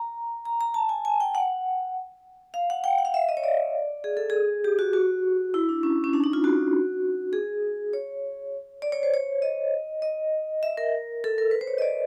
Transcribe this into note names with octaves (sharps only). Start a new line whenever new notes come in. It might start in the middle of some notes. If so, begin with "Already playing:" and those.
Already playing: A#5
A#5
A#5
A5
G#5
G#5
G5
F#5
F5
F#5
G5
F#5
F5
E5
D#5
C#5
D5
G#4
A4
G#4
G4
F#4
F#4
E4
D4
C#4
C#4
D4
D#4
F4
F#4
G#4
C#5
D5
C#5
C5
C#5
D#5
D#5
E5
A#4
A4
A#4
B4
C5
C#5
D#5
D5